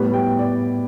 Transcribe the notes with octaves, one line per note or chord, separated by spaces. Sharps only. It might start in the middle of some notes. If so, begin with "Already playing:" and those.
Already playing: A2 G3 B3 B4
G5
D5